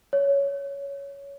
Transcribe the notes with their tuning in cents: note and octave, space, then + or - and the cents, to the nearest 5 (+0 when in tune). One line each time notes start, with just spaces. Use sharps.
C#5 +10